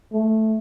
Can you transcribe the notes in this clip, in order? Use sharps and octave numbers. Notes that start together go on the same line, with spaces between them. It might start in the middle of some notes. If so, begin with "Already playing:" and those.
A3